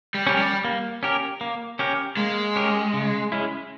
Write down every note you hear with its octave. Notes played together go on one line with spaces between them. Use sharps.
G3
C#4 G4 A#4
G3
A#3
C#4 G4 A#4
A#3
C#4 G4 A#4
G#3 A#3
C#4 G4 A#4
C#3
G#3 C#4 E4